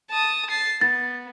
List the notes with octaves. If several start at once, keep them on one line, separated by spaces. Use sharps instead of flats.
A5 D#6
A6 C7
B3 A6